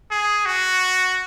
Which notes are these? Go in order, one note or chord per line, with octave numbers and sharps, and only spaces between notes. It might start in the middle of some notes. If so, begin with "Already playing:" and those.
G#4
F#4